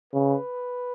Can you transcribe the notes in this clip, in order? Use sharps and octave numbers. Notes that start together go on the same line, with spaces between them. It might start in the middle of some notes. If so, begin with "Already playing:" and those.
C#3 B4